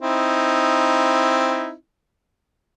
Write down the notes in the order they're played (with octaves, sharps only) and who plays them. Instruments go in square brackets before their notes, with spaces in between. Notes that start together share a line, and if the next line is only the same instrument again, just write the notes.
[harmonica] C4 D#4 E4